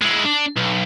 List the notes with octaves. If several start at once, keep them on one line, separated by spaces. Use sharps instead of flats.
G#3 E4
D4
B1